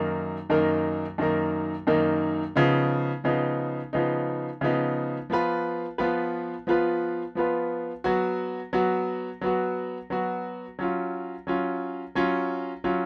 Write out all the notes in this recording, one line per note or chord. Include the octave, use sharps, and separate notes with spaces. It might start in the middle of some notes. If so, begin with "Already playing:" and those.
Already playing: F#2 D#3 A#3 D#4 A#4
F#2 D#3 A#3 D#4 A#4
F#2 D#3 A#3 D#4 A#4
F#2 D#3 A#3 D#4 A#4
C#3 F3 B3 D#4
C#3 F3 B3 D#4
C#3 F3 B3 D#4
C#3 F3 B3 D#4
F3 B3 F4 B4
F3 B3 F4 B4
F3 B3 F4 B4
F3 B3 F4 B4
F#3 B3 F#4
F#3 B3 F#4
F#3 B3 F#4
F#3 B3 F#4
F#3 C#4 F4
F#3 C#4 F4
F#3 C#4 F4
F#3 C#4 F4